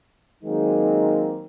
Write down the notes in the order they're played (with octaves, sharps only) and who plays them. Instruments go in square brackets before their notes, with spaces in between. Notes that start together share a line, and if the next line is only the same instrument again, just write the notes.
[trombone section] D#3 F#3 G#3 A#3 C4 D#4